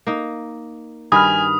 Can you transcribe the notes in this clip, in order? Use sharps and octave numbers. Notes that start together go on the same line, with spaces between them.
A#3 D#4
G2 D#3 F#4 G#5 B5 D#6 F6